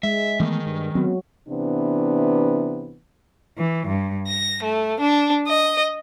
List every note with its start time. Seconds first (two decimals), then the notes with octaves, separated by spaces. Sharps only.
0.03 G#3 E5
0.40 D#3 E3 A3 B3
0.66 G2
0.95 F#3 B3 C4
1.48 C3 E3 B3 D4
3.57 E3
3.86 G2
4.26 A#6
4.62 A3
5.00 D4
5.46 D#5